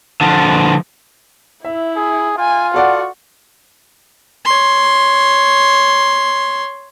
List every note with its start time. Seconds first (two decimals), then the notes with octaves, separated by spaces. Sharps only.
0.21 D3 F3
1.65 E4 E5
1.97 G#4
2.38 F4 G#5
2.74 F#4 A4 D5 F#5
4.45 C#5 C6